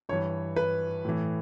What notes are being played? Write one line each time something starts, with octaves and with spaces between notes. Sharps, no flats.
G2 E3 C#5
B4
A2 E3